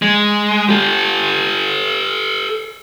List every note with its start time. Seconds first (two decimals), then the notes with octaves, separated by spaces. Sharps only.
0.02 G#3
0.69 G4 A4